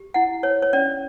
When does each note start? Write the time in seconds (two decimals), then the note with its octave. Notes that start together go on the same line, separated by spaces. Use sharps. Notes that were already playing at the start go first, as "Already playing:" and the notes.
Already playing: G4
0.14 E4 F#5
0.43 C#5
0.62 C#5
0.73 C#4 D5